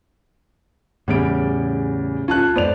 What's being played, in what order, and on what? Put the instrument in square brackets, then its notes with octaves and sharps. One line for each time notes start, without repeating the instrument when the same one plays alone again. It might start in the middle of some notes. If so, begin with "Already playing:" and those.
[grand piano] E2 D7 [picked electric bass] A2 C#3 G3
[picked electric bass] D1 C#4 [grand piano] F4 A5 F#6
[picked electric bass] F2 G#2 B3 [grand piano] C5 D5 F7